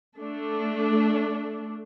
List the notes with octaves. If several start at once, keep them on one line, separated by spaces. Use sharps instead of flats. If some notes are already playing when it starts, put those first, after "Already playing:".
A3 D4